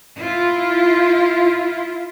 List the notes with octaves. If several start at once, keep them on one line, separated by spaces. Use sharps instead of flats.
E4 F4